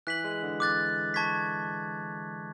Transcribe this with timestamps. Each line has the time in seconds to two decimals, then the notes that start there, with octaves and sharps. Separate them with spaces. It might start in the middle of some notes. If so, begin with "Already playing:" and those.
0.07 E3 F#6 B6 F#7
0.24 G#3
0.43 D3
0.60 D6 F#6 A6
1.14 A5 C#6 G#6 B6